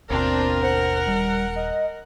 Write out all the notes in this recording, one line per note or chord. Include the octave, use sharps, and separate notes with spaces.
G1 D#2 B2 C4 D4 F4 A#4
C5 F#5
D#1 G3
D#5